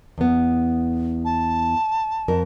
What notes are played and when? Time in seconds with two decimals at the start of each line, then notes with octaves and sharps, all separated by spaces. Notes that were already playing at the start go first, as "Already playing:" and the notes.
0.18 E2 B3
1.25 A5
2.28 F2 A#4